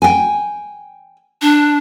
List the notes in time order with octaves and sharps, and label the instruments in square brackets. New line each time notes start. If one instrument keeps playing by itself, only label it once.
[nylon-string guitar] G5 G#5
[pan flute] D4